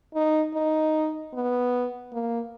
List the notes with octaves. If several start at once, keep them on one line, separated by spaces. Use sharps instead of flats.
D#4
D#4
B3
A#3